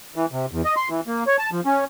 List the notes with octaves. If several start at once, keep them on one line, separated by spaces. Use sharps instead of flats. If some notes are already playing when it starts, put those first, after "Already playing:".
E3
C3
E2
D#5
C6
E3
A#3
C#5
A5
F3
C#4